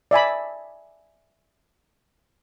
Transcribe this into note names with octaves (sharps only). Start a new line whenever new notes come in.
D5 E5 G#5 B5